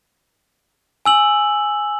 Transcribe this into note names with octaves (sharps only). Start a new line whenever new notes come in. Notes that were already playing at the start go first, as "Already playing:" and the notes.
G#5 E6 F#7